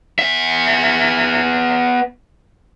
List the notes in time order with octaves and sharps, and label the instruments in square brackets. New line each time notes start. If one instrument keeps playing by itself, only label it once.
[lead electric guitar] B3 E5